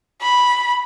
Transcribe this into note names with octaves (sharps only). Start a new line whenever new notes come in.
B5